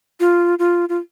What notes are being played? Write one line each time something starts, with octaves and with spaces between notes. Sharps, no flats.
F4
F4
F4